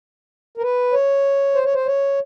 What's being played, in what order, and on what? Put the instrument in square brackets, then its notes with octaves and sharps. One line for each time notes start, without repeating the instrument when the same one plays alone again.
[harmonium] A#4
B4
C#5
C5
C#5
C5
C#5